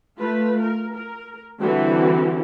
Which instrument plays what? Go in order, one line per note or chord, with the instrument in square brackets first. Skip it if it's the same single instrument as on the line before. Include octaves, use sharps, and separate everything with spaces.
[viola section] A3 F4 B4
A#4
A#4
D3 E3 G3 C4 E4 F#4